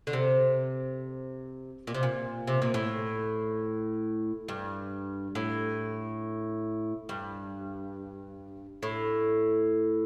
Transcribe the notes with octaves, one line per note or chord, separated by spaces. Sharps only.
D3
C3
A#2
C3
A#2
C3
A#2
A2
G2
A2
G2
A2